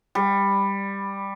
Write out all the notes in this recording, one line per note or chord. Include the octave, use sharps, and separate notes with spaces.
G3